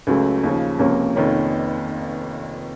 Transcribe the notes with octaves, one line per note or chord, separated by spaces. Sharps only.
C#2 C#3 F#3 A3
D#2 C#3 F3
C#2 C3 F3 A#3 C#4
F1 F2 D#3 A#3 C#4